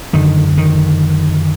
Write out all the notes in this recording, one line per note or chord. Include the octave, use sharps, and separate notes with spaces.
F#2 D3 D#3
D#3